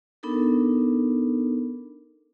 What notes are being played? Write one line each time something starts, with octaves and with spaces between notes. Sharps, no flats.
B3 D4 D#4 A4 A#4